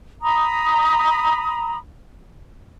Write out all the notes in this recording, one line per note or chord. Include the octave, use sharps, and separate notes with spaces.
A#5 B5 D#6